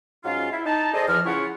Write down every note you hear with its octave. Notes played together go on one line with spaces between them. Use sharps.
G#2 F#3 C#4 F4
E4
D#4 A5
G#4 A4 C5 D5 D#5
E2 F3 F6
C#3 C#4 E4 F4 C#5 F#5